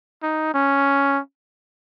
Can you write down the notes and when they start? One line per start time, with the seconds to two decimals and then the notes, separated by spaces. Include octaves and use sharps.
0.23 D#4
0.54 C#4